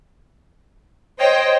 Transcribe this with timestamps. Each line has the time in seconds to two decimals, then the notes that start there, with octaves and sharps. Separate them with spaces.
1.20 C5 C#5 D#5 G5